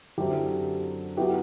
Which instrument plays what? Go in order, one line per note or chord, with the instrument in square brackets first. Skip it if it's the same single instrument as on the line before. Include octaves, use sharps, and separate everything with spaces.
[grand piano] F#2 D3 F#3 C4 [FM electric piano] E4 G4
[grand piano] F#3 B3 F#4 B4 [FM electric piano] E4 G4